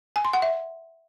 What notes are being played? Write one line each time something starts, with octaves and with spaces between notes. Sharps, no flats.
G#5
C6
F#5
E5